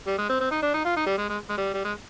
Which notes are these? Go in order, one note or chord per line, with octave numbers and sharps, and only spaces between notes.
G3
G#3
C4
C4
D#4
D4
D#4
F4
D#4
G3
G#3
G#3
G#3
G3
G3
G#3